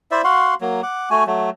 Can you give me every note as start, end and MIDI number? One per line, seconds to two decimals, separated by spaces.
0.11 0.22 64
0.11 0.22 72
0.11 0.22 74
0.11 0.22 76
0.24 0.54 66
0.24 0.54 77
0.24 0.54 78
0.24 0.54 84
0.61 0.81 54
0.61 0.81 58
0.83 1.09 78
0.83 1.09 86
1.10 1.24 57
1.10 1.24 66
1.10 1.24 80
1.27 1.50 54
1.27 1.50 57